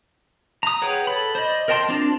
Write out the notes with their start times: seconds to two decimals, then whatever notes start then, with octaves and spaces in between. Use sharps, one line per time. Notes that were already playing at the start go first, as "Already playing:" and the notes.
0.63 A#5 D#6
0.82 G#4 B4 C#5 F#5 G5
1.07 A4 B5
1.35 C5 D5 D#5
1.68 A#4 D#5 G5 A5 C6
1.89 C4 D4 F4 D5 A5